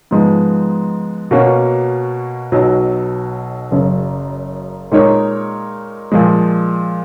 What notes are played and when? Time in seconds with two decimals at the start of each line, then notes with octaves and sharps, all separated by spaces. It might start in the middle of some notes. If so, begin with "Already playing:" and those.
0.11 G#2 F3 G#3 B3
1.31 B2 A#3 C#4 F#4
2.52 B1 B2 F#3
3.71 F#1 F#2 C#3
4.92 A#2 G#3 D#4 A#4 C#5
6.12 A#2 F3 G#3